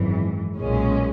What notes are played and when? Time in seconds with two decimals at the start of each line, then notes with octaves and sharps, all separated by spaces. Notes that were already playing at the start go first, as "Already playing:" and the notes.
Already playing: G#1 F#2 E3
0.57 B1 A#2 G#3 C#4